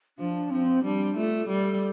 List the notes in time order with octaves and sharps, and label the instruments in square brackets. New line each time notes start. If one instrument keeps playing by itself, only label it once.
[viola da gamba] F3 [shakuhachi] D4
[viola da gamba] F3 [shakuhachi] C4
[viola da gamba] G3 [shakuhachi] D4
[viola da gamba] A3 [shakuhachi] F4
[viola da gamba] G3 [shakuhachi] A4